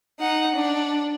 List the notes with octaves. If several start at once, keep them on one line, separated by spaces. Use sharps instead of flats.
D#4 F#5
D4